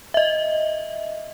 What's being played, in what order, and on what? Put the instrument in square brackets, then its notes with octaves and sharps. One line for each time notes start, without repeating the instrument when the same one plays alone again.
[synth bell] D#5 E5